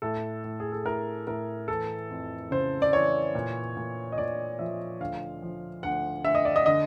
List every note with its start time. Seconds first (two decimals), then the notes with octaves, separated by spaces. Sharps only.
0.02 A2 A4
0.44 A2
0.60 G#4
0.72 A4
0.85 A2 A#4
1.27 A2 A#4
1.68 E3 A4
2.10 F2
2.51 C#3 C5
2.82 D5
2.93 E3 C#5
3.35 A#2
3.77 A#2
4.12 D#5
4.18 A#2 D5
4.59 F3 E5
5.00 D2 F5
5.43 F3
5.83 D2 F#5
6.25 D2 E5
6.35 D#5
6.45 D5
6.56 D#5
6.66 D3 D#5